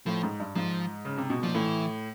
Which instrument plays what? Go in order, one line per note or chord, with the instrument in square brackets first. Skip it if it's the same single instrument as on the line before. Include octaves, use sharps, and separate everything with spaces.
[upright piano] A2 [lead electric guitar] F3
[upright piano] G#2
G2
[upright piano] G#2 [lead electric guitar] F3
[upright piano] C#3
C3
B2
[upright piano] A#2 [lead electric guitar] F3
[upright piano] A2 [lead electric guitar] E3